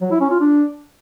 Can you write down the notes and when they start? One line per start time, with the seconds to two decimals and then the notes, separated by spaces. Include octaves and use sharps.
0.01 F#3
0.11 E4
0.21 C#4
0.30 F4
0.40 D4